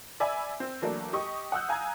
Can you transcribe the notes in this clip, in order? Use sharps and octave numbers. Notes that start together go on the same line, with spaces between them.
D5 E5 G#5 B5 E6
C4
E3 F#3 A3 A#3 D4
G4 D#5 C#6
F#5 D#6 E6 F#6 G6
F5 G#5 A#5 D#6 G#6